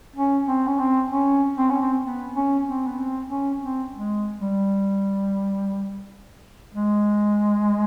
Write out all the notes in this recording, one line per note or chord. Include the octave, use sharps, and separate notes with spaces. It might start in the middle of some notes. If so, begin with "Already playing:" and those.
C#4
C4
C#4
C4
C#4
C4
C#4
C4
B3
C#4
C4
B3
C4
C#4
C4
G#3
G3
G#3